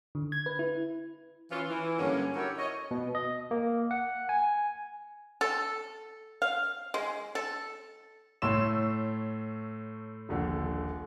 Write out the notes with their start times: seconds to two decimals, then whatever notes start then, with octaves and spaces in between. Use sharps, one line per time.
0.15 D3
0.32 G#6
0.46 B4
0.59 E4
1.51 E3 C#4 F4
1.69 E3
1.99 G2 D3 F#3 A#3 C#4
2.35 E4 F#4 G4 A4 A#4 C#5
2.58 C#5 D#5
2.91 B2
3.15 D#5
3.51 A#3
3.91 F#5
4.29 G#5
5.41 A4
6.42 F5
6.94 G#3
7.35 A4
8.42 A2 A3 C#5 C6 E6 E7
10.29 D#1 A#1 D3